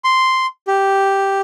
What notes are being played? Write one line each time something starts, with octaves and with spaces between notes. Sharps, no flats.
C6
G4